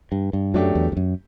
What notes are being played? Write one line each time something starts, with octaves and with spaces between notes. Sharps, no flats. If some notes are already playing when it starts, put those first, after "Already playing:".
G2
G2
F#2 F#3 A3 D4 G4
E2
E2
F#2